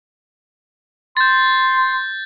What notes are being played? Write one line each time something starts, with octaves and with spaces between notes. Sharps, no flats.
C6 G6 A6